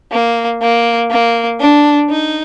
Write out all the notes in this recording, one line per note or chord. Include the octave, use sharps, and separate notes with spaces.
A#3
A#3
A#3
D4
D#4